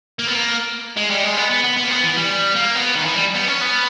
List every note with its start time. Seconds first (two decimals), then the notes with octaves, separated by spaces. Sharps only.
0.19 A#3
0.27 B3
0.35 A#3
0.97 G#3
1.11 G3
1.24 G#3
1.37 B3
1.50 B3
1.64 B3
1.76 B3
1.84 A#3
1.90 B3
2.03 E3
2.16 G3
2.56 A#3
2.76 B3
2.95 D#3
3.05 E3
3.15 G3
3.35 B3
3.48 C#4
3.61 B3